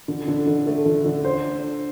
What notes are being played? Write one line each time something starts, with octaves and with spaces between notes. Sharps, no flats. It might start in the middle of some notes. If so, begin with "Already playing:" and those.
D3
D3
D3
A3
D3
D3
C5